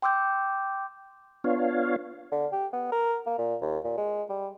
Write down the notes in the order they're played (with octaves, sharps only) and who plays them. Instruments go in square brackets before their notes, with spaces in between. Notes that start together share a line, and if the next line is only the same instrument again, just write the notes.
[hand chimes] G5 C6 D6 E6 G6
[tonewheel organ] B3 D4 F4 C#5 F5
[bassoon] D3
G4
B3
A#4
A#3
A#2
D#2
A#2
G#3
G3